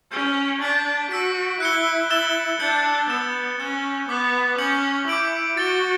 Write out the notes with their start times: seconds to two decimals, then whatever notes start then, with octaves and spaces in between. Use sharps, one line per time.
0.12 C#4 G6 D7 G7
0.61 D4 G6 B6 D7 F#7
1.11 F#4 E6 B6 D7
1.60 E4 F#6 C#7 G7
2.10 E6 A6 E7 G7
2.60 D4 G6 C#7 F#7
3.09 B3 E6 A6 E7 G7
3.59 C#4 F#6 A6 E7 G7
4.09 B3 D6 F#6 B6 F#7
4.58 C#4 D6 G6 C#7 F#7
5.08 E4 D6 G6 D7 F#7
5.57 F#4 A6 D7 G7